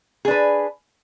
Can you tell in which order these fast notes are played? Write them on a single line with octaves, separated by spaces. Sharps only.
G#4 D4 B4